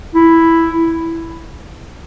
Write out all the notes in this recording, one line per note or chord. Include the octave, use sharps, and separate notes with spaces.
E4